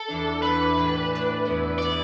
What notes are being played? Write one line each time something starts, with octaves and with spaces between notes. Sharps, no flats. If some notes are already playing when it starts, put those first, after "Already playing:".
Already playing: A4
E2 E3 D4
E2 E3 D4 B4
A2 E3 D4
A2 E3 D4
E2 E3 B3 E4
E3 B3 E4 D5